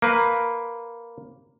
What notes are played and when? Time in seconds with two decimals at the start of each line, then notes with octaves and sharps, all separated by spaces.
0.02 A#3 B4